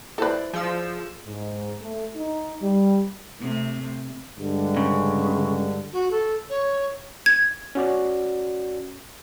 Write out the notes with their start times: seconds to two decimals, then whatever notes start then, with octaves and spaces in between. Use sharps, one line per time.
0.18 E4 A4 B4 C5 D5
0.54 F3 G#4 E6
1.27 G#2
1.80 A3
2.15 D#4
2.61 G3
3.40 C3 A3
4.38 G2 D3 G#3
4.77 C#3
5.92 F#4
6.11 A4
6.49 C#5
7.26 G#6
7.75 C#4 F#4 D5